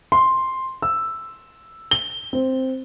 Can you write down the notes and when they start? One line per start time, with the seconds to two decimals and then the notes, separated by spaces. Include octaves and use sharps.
0.12 C6
0.82 E6
1.91 G7
2.33 C4